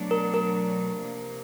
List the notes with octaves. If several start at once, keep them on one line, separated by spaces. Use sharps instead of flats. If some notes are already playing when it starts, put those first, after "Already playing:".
Already playing: B2 F#3 A3 D4
A#4
A#4
C3 F3 A#3